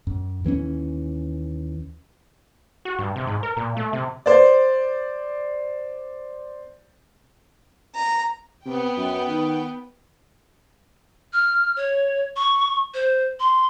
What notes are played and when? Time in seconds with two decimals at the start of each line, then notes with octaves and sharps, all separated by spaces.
0.07 F#2
0.44 D#2 E3 C4 C#4
2.85 F#4
2.99 G2
3.16 C3
3.27 G#2
3.43 A#4
3.57 A#2
3.77 A3
3.93 C3
4.26 C5 D5
7.95 A#5
8.65 C3 B3 G5
8.97 F#2
9.28 D#3
11.33 F6
11.76 C#5
12.36 C#6
12.94 C5
13.40 C6